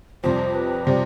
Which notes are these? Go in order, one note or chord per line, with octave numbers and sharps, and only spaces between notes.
F2 C3 G3 C5
B4
C3 G3 C5